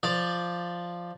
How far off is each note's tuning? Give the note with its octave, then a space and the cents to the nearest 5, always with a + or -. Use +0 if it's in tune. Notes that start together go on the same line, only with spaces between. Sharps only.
F3 +0 D5 +0